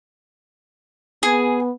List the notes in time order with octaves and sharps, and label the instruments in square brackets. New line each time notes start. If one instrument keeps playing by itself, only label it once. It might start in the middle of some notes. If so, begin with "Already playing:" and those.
[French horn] B3 [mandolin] G#4